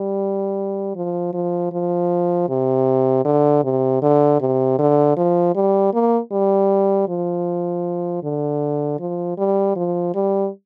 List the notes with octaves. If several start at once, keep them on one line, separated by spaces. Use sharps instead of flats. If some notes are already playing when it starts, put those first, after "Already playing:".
Already playing: G3
F3
F3
F3
C3
D3
C3
D3
C3
D3
F3
G3
A#3
G3
F3
D3
F3
G3
F3
G3